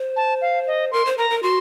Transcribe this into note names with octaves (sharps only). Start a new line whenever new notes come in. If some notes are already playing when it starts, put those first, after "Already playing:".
Already playing: C5
A5
F5
D#5
A#4 C6
C5
A#4 A#5
A#4
F#4 C6